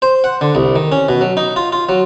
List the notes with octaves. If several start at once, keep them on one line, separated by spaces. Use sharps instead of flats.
C5
F#5
D3
C2
D#3
C#4
B2
F#3
D#4
F4
F4
F#3